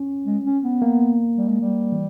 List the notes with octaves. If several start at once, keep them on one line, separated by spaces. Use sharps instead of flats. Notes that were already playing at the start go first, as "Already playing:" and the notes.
Already playing: C#4
G#3
C#4
B3
A#3
G3
G#3
G3
E3